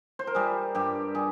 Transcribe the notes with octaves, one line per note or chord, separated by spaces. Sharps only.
C5
A#4
G3 G#4
G2 G4
G3 G#4